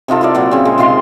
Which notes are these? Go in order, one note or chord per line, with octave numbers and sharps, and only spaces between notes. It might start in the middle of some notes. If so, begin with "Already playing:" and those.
C3 D#4 F4 A4
E4 F4 A#4 D5
A#2 F#3 D5
C#3 C4
A#2 G#3
C3 D#3 F4 C6